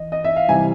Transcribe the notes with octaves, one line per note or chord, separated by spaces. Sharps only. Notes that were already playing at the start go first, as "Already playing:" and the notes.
Already playing: E3 D#5
D#5
E5
F5
C3 E3 G3 G#5